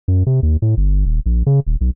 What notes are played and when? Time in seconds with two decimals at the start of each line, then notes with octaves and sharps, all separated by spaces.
0.08 F#2
0.27 C3
0.43 D#2
0.62 A2
0.77 G1
1.05 D#1
1.26 A#1
1.46 C#3
1.67 D#1
1.81 B1